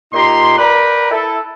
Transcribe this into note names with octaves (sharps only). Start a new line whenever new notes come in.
A#2 D#4 G4 A#5 C6
A#4 B4 D5 G5 A#5 B5
E4 A4